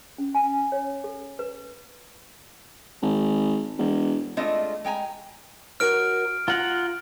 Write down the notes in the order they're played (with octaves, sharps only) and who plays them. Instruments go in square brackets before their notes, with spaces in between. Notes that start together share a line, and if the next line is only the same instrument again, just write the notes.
[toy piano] C#4
G#5
C#5
A4
B4
[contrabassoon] G#1
E1
[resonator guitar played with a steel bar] G#3 A3 C4 D4 F4 D#5
G#3 G5 G#5 A#5
[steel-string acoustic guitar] F#4 A#4 C#5 [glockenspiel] F6 D7
[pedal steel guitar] F4 F#5 [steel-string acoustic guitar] A#5